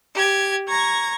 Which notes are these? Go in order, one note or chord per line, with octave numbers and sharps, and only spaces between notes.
G4 G#6
A#5 C#6 G#6 A#6